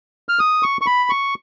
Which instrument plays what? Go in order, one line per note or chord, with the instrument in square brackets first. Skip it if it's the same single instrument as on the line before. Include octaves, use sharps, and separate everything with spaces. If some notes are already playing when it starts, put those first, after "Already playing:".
[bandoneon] F6
D#6
C#6
C#6
B5
C#6